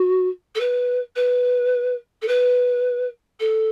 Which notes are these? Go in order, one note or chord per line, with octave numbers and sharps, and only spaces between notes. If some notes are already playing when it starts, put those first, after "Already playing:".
Already playing: F#4
A4
B4
B4
A4
B4
A4